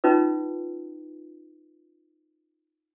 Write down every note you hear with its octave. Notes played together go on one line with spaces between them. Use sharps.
C#4 D#4 F4 B4